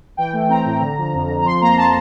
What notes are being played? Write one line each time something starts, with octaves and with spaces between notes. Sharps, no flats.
E3 G5
A3
C4 A#5
A2
D3
F3
F2
F2
A#5
F3 C6
A#3 A#5
A5